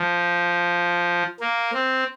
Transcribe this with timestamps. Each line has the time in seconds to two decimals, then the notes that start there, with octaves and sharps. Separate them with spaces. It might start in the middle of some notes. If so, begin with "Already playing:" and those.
Already playing: F3
1.40 A#3
1.74 C4